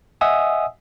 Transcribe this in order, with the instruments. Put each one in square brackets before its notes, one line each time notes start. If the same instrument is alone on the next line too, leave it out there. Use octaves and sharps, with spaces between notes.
[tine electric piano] D#5 E5 F#5 G#5 D#6 E6